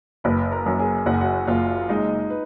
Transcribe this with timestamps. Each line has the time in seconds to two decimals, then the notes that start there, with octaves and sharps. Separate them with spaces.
0.24 F#1 B4 B5
0.52 A#4 A#5
0.66 F#2
0.79 G#4 G#5
1.06 F#1 F#5
1.14 G#5
1.21 F#4 F#5
1.47 F#1 F4 F5
1.89 G#3 D#4 D#5
2.30 B4